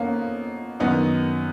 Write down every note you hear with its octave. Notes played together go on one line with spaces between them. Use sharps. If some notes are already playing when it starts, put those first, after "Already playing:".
Already playing: F2 A#3 B3 C#4 D#4
F#2 D#3 B3 D#4